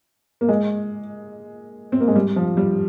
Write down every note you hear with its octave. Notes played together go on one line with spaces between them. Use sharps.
A#3
G#3
C4
A#3
G#3
G3
F3
G3